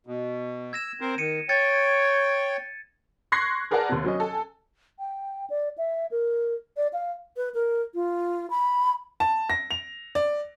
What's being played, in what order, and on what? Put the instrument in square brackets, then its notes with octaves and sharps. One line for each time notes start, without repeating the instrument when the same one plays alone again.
[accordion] B2
[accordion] E6 [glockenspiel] G#6 A#6 E7
[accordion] C4 A#4 C5
[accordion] D#3 [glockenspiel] C#7 D#7
[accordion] C#5 G5 [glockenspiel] G#6 A6 C#7
[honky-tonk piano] C6 C#6 F#6 G#6 A#6 C7
G#4 A#4 B4 D5 F#5 A5
D#2 C3
F#3 C#4 D#5
A4 G#5
[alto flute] G5
D5
E5
A#4
D5
F5
B4
A#4
F4
B5
[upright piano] A5
A#6
F7
D5